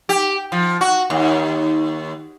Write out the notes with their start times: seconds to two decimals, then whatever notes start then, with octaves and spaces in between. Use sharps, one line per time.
0.09 G4
0.52 F3
0.81 F#4
1.10 D#2